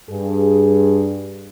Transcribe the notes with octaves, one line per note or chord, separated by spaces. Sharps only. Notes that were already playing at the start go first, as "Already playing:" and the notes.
G2 G#4